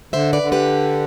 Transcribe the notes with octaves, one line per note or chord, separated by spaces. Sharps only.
D3 C5 E5
B4 D5
D3
G4 B4